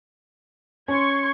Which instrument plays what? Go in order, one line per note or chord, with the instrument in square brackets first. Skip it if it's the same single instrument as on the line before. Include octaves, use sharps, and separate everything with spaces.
[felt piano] C#4 [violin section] C6 C#6 G#6